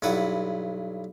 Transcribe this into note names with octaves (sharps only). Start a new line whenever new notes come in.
B1 G2 E4 B4 F#5